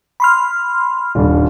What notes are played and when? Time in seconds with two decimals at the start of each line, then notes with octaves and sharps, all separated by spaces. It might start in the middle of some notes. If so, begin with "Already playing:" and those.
0.20 B5 C6 F6
1.15 D#1 G2